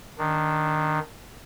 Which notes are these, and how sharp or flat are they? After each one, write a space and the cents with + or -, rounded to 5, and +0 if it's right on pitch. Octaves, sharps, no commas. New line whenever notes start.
D#3 -10 D4 -5